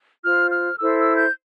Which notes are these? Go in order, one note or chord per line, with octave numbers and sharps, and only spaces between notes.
F4 C5 F6
F6
E4 A4 C5 E6
E6
G6